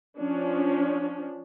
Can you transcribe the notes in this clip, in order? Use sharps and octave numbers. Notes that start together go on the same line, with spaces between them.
F3 C#4 D4